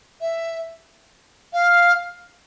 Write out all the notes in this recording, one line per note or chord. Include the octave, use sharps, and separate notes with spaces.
E5
F5